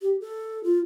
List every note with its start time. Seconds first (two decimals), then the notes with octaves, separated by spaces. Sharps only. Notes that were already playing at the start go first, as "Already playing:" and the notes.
0.02 G4
0.21 A4
0.64 F4